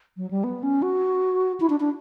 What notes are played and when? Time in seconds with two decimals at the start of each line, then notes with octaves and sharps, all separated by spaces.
0.17 F#3
0.31 G3
0.44 B3
0.63 C#4
0.82 F#4
1.60 E4
1.70 D4
1.80 D4